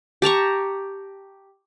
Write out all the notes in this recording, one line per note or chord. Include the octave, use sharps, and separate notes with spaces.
G4 A5 A#5 C#6